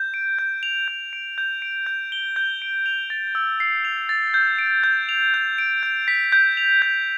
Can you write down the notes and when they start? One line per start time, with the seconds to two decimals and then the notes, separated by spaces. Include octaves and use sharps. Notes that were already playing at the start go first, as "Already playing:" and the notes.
Already playing: G6
0.14 D7
0.39 G6
0.63 F7
0.88 G6
1.13 D7
1.38 G6
1.62 D7
1.86 G6
2.12 G7
2.36 G6
2.62 D7
2.86 F7
3.10 A6
3.35 E6
3.60 C7
3.85 F7
4.09 A6
4.34 G6
4.59 D7
4.84 G6
5.09 F7
5.34 G6
5.58 D7
5.83 G6
6.08 B6
6.32 G6
6.57 F7
6.82 G6